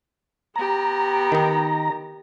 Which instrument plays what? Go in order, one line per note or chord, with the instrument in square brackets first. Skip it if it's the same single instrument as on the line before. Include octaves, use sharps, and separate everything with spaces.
[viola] B3 G4 [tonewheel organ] A#5
[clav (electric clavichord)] D#3 D#4